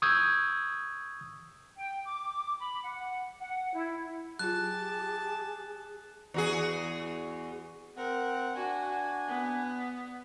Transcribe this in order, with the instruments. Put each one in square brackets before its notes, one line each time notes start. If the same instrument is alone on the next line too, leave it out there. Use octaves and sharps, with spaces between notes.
[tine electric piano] C#6 D#6 E6 G6 G#6
[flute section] G5
D6
B5
F#5
F#5
E4
[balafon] F#3 F4 [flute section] G4 G#4 [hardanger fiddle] A5 [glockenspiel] F#6
[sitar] E2 F#4 G#4
[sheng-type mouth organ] C4 F#5 [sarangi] A#4
[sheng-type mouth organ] D4 G#5 [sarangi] F#4
[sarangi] B3